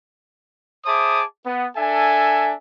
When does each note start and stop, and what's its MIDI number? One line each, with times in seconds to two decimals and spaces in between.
0.85 1.22 68
0.85 1.22 72
0.85 1.22 76
0.85 1.22 81
0.85 1.22 86
0.85 1.22 87
1.46 1.66 59
1.77 2.53 62
1.77 2.53 69
1.77 2.53 76
1.77 2.53 80